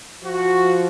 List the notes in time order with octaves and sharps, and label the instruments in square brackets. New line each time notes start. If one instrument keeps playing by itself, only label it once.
[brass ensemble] F3 F#4